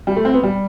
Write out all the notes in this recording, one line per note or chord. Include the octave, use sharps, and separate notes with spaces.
G3
A3
C4
B3
G3